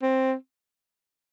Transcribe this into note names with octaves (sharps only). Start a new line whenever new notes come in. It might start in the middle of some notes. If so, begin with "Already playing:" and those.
C4